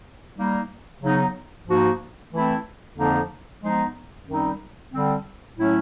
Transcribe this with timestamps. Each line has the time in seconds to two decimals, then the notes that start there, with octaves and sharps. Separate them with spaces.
0.38 G3 A#3 D#4
1.03 C#3 F#3 B3 D#4
1.68 G#2 F3 A#3 D#4 F#4
2.33 E3 A3 C4 E4
2.97 F2 D3 F3 A#3 D#4
3.62 F3 G#3 B3 D#4
4.27 F#2 D#3 G3 C4 D#4
4.92 D3 G3 C4
5.57 A2 F#3 A3 C#4 E4